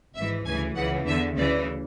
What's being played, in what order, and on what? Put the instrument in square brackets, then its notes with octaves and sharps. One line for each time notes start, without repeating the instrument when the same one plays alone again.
[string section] G#1 G#2 E3 E5
D2 C#3 E3 G#5
C#2 C#3 E3 F#5
E2 D3 E5
D2 C#3 E3 D5